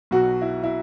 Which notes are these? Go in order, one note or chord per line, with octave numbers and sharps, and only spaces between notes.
B1 B2 F#3 F#4
E4
E4